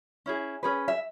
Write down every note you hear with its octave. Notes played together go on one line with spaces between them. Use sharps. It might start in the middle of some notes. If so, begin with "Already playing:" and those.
C#4 E4 G#4
C#4 G#4 B4
E5